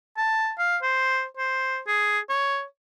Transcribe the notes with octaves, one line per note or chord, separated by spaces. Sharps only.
A5
F5
C5
C5
G#4
C#5